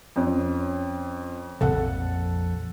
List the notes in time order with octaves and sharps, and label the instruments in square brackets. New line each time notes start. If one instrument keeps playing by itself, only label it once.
[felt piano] F2 C#4 C#5
[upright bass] A#1 F2 [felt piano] A4 F#5